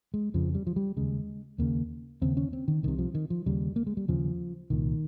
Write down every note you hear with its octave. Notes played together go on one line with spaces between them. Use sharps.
G#3
F2 C#3 F3
G3
F3
G3
D#2 C#3 G#3
D#2 C#3 A#3
D#2 C#3 C4
C#4
C4
D#3
C2 C3 D#3
F3
D#3
F3
D#2 C#3 G3
A#3
G#3
G3
D#2 C#3 F3
C2 A#2 D#3